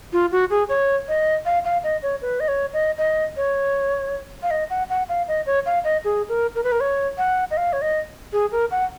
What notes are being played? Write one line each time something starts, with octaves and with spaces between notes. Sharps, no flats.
F4
F#4
G#4
C#5
D#5
F5
F5
D#5
C#5
B4
D#5
C#5
D#5
D#5
C#5
F5
D#5
F#5
F#5
F5
D#5
C#5
F5
D#5
G#4
A#4
A#4
B4
A#4
C#5
F#5
D#5
F5
C#5
D#5
G#4
A#4
F#5